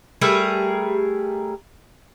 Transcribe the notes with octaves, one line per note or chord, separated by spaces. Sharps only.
G3 A3 G#4 A#4